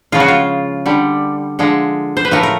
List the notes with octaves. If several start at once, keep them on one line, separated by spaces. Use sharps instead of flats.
C#3 F3 G#3 F4
F#4
F4
D3 G3
D3 F3 G#3
C5
B4
A2 F3 A3 A#4
A#4